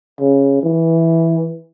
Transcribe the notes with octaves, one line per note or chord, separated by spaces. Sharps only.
C#3
E3